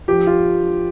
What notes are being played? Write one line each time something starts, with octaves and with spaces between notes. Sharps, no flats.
F3 G4
F4